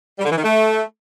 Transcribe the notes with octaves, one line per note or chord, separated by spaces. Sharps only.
G3
D3
E3
D#3
A3